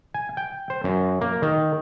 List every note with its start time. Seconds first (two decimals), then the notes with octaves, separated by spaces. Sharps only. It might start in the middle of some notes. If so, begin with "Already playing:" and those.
0.14 G#5
0.37 G5
0.70 C5
0.84 F#2
1.21 A#3
1.42 D#3